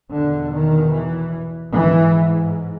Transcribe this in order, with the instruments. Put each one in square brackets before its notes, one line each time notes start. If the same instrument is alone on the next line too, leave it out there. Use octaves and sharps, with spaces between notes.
[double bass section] E2 B2 D3
D#3
E3
G#2 E3